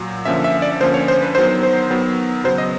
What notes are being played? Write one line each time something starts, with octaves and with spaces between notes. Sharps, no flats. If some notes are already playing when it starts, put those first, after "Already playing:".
Already playing: A#2 F#3
D3 F3 A#3 C#4 E5
E5
D5
D3 F3 A#3 C#4 C5
C#5
C5
B4
D#3 F#3 B3 C5
C5
D#3 F#3 B3
C#3 F#3 B3 C5
D#5